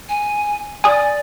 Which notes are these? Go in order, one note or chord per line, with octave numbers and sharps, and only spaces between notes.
G#5
D5 G#5 D#6